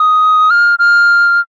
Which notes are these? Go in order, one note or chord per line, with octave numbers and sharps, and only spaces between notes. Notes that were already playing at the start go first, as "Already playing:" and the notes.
Already playing: D#6
F6
F6